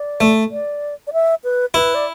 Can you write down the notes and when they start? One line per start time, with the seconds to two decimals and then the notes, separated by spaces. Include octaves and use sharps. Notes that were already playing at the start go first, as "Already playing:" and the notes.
Already playing: D5
0.21 A3
0.51 D5
1.07 D5
1.13 E5
1.44 B4
1.74 E4 B4
1.95 D5